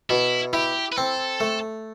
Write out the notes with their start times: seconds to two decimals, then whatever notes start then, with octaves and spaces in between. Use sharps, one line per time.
0.10 B2 E4
0.53 E4 G4
0.92 B4
0.97 C4 A4
1.40 A3